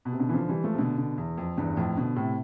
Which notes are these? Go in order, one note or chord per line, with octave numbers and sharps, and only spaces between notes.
B2
C3
B2 D3
E3
D3 F3
E3 G3
F3 A3
C3
B2 D3
B2 D3
E2
F2
E2 G2
F2 A2
B2 D3
A2 C3